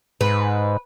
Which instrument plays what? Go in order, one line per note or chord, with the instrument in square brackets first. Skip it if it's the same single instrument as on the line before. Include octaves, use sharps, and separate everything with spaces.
[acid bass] G#2 [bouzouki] B4